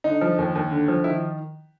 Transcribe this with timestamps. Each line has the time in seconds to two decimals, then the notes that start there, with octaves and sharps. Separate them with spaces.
0.04 D3 D#4
0.21 F3
0.39 D#2
0.55 D#2
0.71 D3
0.88 F3
1.04 D#3 E4